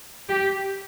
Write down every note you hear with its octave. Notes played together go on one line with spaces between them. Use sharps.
G4